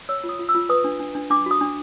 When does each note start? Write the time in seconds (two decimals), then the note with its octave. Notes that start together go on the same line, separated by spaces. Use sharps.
0.09 C#5 E6
0.24 F4
0.29 D#6
0.39 F4
0.49 E6
0.55 F4
0.69 B4 D#6
0.84 D4
1.00 D4
1.15 D4
1.30 D4 D6
1.46 F#4 D#6
1.61 D4